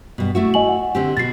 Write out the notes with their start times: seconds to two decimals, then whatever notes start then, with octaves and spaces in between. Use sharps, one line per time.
0.18 G2 B2
0.35 A3 E4 F#4
0.54 D#5 G#5 F#7
0.69 F#5
0.95 D3 C4 G4
1.17 B2 F#4 A6 C7